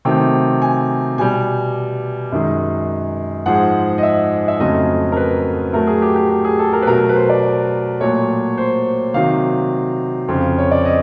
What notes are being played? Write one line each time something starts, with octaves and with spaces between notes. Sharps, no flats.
C3 D#3 F#3 A3 G5
G#5
B2 G3 G#5
F#2 D#3 G#3
G#2 F3 G#3 F#5
D#5
E5
E5
F2 C#3 F#3 A3 D#5
A#4
B4
A2 F#3 A3 A#4
G#4
G4
G4
G4
G#4
A4
A#4
B4
B2 F#3 A3 A#4
B4
C5
D5
A#2 F#3 A3 C#5
C5
C3 D#3 F#3 F5
F2 C#3 F3
C#5
D5
D#5